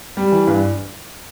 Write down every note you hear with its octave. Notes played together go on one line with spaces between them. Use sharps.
G3
E3
G2